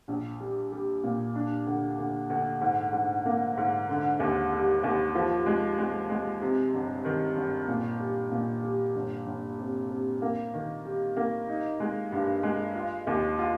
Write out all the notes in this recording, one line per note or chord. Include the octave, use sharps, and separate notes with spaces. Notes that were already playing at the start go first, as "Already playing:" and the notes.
A#1
G3
G3
A#2
D4
D2
D2
D2
G#2
G#2
A#3
G#2
D3
D#2
G3
D#2
F3
G#3
G#3
G#3
C3
G1
D#3
G1
A#2
G3
A#2
G3
G1
G1
C3
C3
A#3
D#3
G3
A#3
D#4
G#3
G2
G#3
F4
D#2
F4